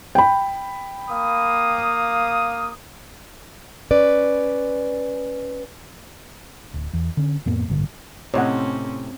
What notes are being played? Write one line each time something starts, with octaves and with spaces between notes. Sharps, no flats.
G5 B5
A#3 F5 D#6
C#4 B4 D5
D1
E2
D3 C#4
F2 A2 A#3 B3
A1 G2 D3
A2 C3 C4 C#4 C#5 D#5 F#5